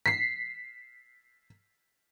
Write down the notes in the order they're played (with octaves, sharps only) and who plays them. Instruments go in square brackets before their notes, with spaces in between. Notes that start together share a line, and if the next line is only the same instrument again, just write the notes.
[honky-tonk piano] B6 C7